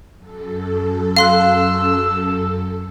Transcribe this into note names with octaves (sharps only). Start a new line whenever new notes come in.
F#2 A4
F5 C6 E6 F#6